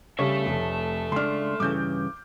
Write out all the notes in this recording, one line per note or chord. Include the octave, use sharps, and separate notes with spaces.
C#3 G3 A4 C#5 E5
F1
C#2 D4 C6 F6
G2 C#3 E3 D6 G6